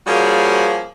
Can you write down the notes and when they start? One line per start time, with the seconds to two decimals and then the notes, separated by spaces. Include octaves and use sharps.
0.07 F3 G3 A#3 C#4 F#4 G#4